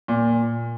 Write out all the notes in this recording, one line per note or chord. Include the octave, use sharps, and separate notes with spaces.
A#2